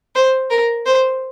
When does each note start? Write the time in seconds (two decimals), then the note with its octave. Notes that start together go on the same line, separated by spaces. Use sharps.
0.15 C5
0.50 A#4
0.86 C5